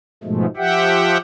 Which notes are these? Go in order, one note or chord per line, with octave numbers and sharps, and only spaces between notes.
G#2 B2 F3 G#3 A3
F3 G4 E5 F#5 G5